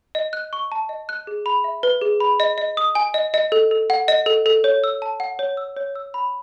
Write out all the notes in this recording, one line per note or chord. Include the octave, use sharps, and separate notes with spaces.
D#5
F#6
C#6
A5
D#5
F#6
G#4
B5
E5
B4
G#4
B5
D#5
D#5
D#6
G#5
D#5
D#5
A4
A4
F#5
D#5
A4
A4
C#5
E6
A5
F#5
C#5
E6
C#5
E6
B5